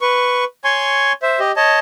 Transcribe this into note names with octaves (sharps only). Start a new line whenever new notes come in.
B4 C#6
C#5 G#5 C6 C#6
C5 E5
G4 D#5
C#5 D#5 A5